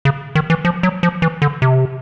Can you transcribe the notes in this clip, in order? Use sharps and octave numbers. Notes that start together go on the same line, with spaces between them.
C#3
D#3
E3
F3
F#3
F3
E3
D3
C3